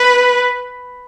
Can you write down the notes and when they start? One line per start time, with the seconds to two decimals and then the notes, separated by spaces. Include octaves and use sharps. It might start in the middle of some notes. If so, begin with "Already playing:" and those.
Already playing: B4